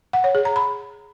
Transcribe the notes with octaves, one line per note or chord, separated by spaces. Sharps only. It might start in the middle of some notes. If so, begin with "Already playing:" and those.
F#5
C#5
G#4
A#5
B5